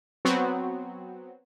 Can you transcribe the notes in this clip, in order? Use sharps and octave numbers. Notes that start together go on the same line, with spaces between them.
F#3 B3 C4 F#4